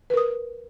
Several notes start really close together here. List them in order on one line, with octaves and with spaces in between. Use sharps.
B4 A#4 D#6